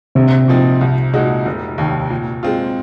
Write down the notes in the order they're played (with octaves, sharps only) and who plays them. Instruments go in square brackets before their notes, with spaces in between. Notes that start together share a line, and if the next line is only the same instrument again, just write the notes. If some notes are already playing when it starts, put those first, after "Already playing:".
[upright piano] A#1 [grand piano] C3
[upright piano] A#2 F3 C4 D#4
C2
A#2 G#3 D#4 F#4
F1
D#2 D#3
A#2
G#3 C4 F4